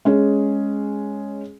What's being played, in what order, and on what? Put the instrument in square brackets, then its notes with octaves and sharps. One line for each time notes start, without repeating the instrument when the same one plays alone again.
[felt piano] G#3 C#4 G#4